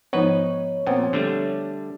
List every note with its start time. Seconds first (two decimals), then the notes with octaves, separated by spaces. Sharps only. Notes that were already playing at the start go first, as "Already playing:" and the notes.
0.13 G#2 F3 B3 D#4 B4 C#5
0.87 A#2 F3 B3 C4
1.13 D3 G3 A3